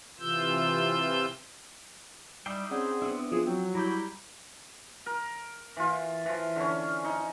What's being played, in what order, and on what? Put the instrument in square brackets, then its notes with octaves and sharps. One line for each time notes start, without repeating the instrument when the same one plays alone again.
[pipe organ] C3 E3 F4 E6 G6
[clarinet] G3 [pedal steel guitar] D#4 E4 G5 [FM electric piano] D6 C7
[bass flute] C4 [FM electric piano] C#4 D5 F#5 [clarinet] G#4
[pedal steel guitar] B3 D4 E4
[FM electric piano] F3 [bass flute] C4 [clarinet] G#4
[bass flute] F#3 [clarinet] C4
[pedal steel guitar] G3 [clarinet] E4 [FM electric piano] A#5 D6 G6
[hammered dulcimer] A#4
E3 F4
E3 F3
D3 C#4
D#4